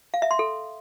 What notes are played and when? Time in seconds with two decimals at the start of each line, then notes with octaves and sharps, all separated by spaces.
0.14 F5
0.22 E5
0.31 C6
0.39 A4